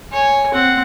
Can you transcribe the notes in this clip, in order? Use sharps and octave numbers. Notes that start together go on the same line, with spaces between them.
C#5 G#5
C4 F#5